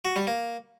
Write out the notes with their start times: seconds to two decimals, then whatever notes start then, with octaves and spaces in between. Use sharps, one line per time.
0.05 F#4
0.16 G3
0.27 A#3